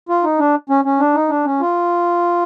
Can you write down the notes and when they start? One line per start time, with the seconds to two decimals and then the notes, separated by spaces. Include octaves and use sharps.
0.09 F4
0.24 D#4
0.39 D4
0.70 C#4
0.85 C#4
1.00 D4
1.15 D#4
1.29 D4
1.45 C#4
1.61 F4